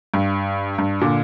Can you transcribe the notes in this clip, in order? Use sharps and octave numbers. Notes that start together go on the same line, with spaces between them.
G2
G2
A#2 D3